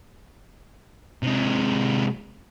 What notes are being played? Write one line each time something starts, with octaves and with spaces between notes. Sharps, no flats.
C3 G#3